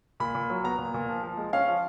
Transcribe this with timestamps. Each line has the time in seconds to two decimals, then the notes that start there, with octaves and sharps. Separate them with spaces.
0.20 A#2 B5
0.35 A#2
0.50 F#3
0.64 B3 A#5
0.78 A#2
0.94 A#2
1.09 F3
1.23 F3
1.37 G#3
1.53 C#4 F5
1.67 F3